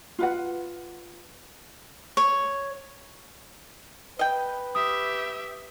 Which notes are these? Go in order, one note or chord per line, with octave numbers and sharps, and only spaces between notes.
F4 B4 F#5
C#5
B4 D#5 G5
G4 E5 D#6